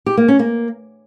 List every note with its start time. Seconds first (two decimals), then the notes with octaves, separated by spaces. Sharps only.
0.06 G4
0.17 A#3
0.28 C#4
0.39 A#3